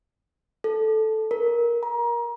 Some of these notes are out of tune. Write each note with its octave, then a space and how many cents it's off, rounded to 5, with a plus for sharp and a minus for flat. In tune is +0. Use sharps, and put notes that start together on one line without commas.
A4 -5
A#4 +20
A#5 +25